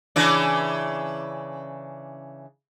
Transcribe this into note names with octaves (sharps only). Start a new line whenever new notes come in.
C#3 E3 D4